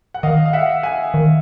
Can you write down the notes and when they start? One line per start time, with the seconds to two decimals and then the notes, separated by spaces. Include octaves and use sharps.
0.14 F#5
0.23 D#3 D#5 F5
0.45 F5
0.53 E5 F#5
0.83 F#5 G#5
1.14 D#3